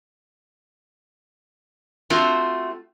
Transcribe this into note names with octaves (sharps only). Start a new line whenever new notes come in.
A3 C4 F4 F#4